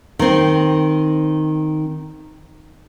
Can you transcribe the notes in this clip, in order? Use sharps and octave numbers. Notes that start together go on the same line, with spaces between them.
D#3 C4